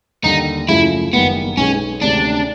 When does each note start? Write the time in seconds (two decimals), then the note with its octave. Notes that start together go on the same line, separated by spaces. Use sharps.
0.24 D#2 D3 G3 D#4
0.69 F#2 C#3 F3 A3 E4
1.13 F#1 F#2 D#3 G3 A#3 B3
1.57 B1 B2 G#3 C#4
2.02 D2 C3 D#3 G#3 C#4 D4